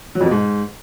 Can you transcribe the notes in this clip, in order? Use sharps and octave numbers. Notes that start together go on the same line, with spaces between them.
F#3
F2
B2
G#2